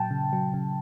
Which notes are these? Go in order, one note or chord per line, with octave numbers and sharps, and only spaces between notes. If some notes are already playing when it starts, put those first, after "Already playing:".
Already playing: A#2 F#3 G5 A5
C#3
F#3
C#3